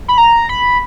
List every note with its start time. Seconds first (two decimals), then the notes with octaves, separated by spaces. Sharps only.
0.08 B5
0.18 A#5
0.49 B5